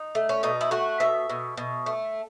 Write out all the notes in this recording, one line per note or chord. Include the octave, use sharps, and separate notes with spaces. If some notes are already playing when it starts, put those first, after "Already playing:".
Already playing: D#4
A3
C#4
B2 D#4
E4
A3 F#4
B2 E5
B2
B2
A3